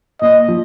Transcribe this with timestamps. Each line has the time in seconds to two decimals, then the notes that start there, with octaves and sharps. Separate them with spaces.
0.22 A#2 D#5
0.48 F3